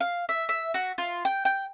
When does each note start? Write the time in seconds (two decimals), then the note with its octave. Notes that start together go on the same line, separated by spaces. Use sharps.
0.01 F5
0.29 E5
0.49 E5
0.74 F#4
0.98 F4
1.25 G5
1.45 G5